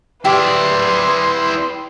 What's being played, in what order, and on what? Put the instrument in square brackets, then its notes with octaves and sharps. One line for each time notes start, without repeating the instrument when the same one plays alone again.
[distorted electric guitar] E4 D5 [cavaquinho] G4 [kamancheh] B4 C6